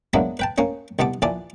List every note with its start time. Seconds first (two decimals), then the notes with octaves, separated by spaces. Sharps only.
0.14 F#3 G#3 A#3 B3 D4 E4
0.39 B4 G5 A5
0.58 A#3 C#4 C#5
0.99 C2 B2 B3 A5 D6
1.22 A#1 E3 D5 G#5 A5 D6